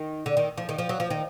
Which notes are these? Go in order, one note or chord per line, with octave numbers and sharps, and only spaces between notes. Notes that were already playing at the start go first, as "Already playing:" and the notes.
Already playing: D#3
D3
D#3
F3
D#3
F3
F#3
F3
D#3